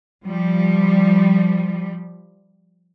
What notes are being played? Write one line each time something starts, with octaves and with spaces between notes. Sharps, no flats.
F3 G3